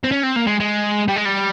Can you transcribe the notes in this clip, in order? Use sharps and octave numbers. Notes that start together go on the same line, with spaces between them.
C4
C#4
C4
A#3
G#3
G#3
G3
G#3
G3